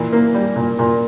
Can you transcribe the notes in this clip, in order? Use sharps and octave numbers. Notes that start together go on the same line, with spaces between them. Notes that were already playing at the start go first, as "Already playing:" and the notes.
Already playing: A#2 E3
A#3
G3
A#2
A#2